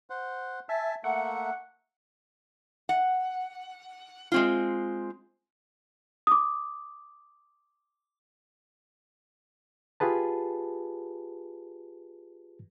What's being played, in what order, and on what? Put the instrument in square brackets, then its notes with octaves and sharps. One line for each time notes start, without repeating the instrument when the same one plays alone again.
[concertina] C5 F#5
[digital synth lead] E5 [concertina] G#5 A5
[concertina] A3 A#3 E5 [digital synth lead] F#5
[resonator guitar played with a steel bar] F#5
G#3 C4 F4
[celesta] D6 D#6
[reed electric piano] F4 G4 G#4 B4 A5